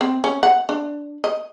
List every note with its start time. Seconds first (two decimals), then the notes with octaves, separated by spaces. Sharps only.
0.01 C4
0.24 C#4
0.43 F#5
0.69 D4
1.24 D#5